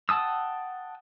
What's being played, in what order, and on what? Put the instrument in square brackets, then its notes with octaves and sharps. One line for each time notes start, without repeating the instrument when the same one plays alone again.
[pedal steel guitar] F#5 G5 A5 D#6 E6